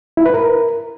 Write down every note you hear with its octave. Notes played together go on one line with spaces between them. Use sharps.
E4
B4
A#4